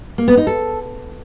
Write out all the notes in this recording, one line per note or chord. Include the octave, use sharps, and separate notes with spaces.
A#3
B3
D#4
A4